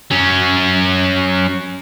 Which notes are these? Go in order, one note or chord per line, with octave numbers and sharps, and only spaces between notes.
F#3 C#4